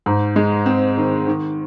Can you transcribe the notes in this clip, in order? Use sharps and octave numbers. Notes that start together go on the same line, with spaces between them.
G#2
G#3
C4
D#3
D#3